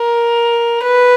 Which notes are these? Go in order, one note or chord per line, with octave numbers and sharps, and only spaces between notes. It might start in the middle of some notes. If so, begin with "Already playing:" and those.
Already playing: A#4
B4